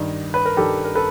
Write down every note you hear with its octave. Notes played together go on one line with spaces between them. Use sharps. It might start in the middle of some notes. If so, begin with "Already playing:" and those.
Already playing: G2 D#3
B4
A#4
G2 D#3 G4 A4
A#4
A4 B4